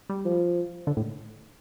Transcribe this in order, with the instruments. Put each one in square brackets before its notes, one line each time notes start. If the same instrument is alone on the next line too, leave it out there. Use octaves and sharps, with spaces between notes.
[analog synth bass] G3
[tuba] F3
[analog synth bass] D3
A2